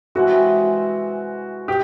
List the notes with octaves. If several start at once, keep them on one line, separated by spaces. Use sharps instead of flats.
C3 E3 G#3 F#4
G4